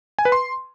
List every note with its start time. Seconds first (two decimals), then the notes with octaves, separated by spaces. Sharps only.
0.19 G#5
0.25 B4
0.32 C6